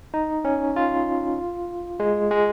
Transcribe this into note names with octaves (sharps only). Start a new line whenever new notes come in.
D#4
C#4
F4
G#3
G#3